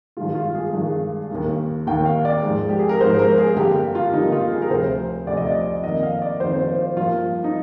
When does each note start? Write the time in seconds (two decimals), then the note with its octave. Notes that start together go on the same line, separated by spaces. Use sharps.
0.17 G2 D#3 G#3 F4
0.35 F4
0.55 G#4
0.73 G2 D#3 G#3
1.30 D#2 D#3 A#3
1.87 D#2 D#3 A#3 G5
2.05 F5
2.25 D5
2.43 G#2 F3 G#3
2.69 G4
2.79 G#4
2.89 A#4
3.01 G#2 F3 G#3 C5
3.19 A#4
3.38 G#4
3.57 G2 D3 G3 A#3 G4
3.75 G4
3.95 F4
4.13 G2 D3 G3 A#3 D#4
4.32 F4
4.52 G#4
4.62 A#4
4.70 D2 C3 F3 C5
5.27 D2 C3 F3 D5
5.37 D#5
5.46 D5
5.84 F2 D#3 A#3 D#5
6.03 F5
6.22 D5
6.40 F2 D#3 A#3 C5
6.59 C5
6.78 F4
6.96 G2 F3 A#3 F4
7.44 D#4